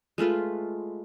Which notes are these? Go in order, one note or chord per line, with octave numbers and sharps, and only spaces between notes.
G#3 A3 F4 B4